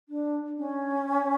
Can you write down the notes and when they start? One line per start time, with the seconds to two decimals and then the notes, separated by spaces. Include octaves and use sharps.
0.08 D4
0.57 C#4